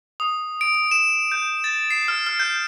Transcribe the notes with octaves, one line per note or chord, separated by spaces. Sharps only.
D#6
D7
D7
E7
G6
A6
C7
F6
F6
G6